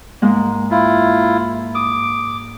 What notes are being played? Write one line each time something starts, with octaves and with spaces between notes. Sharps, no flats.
G#2 G#3 A#3
E4 F4
D6 D#6